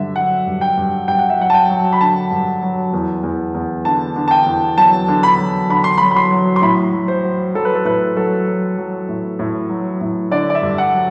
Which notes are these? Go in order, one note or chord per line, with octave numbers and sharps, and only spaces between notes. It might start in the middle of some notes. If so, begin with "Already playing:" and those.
Already playing: G2 D3 F#3 E5
F#3 F#5
G2
G5
G2
G2 G5
F#5
E5
F#3 F#5
A5
G5
F#3
B5
D3 A5
G2
F#3
E2
E2
E2
D3 A5
D3
A5
G5
E2
F#3 A5
D3
B5
F#3
D3 B5
C6
F#3 B5
B5
C6
F#3
C6
A2 B5
F#3
C5
F#3
F#3 A4
B4
A4
A2 B4
F#3 A4
F#3
F#3
A2
A2
F#3
A2
D3 D5
D5
E5
G2
F#5
F#3